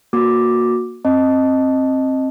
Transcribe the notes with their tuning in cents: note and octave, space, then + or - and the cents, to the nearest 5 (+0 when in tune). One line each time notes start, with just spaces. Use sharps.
A#3 +5 F#4 -20 D6 +0
C4 +20 D#5 +0 A5 +0